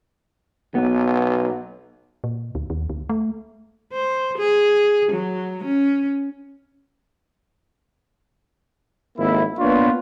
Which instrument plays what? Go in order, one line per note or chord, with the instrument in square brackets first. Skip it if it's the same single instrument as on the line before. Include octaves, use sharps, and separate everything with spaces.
[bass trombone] B1 [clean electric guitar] B3
[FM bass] A#2
D2
D#2
D2
A3
[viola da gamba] C5
G#4
F#3
C#4
[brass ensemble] G#1 F2 A#3 E4
A#3 B3 D4 F4 B4 C#5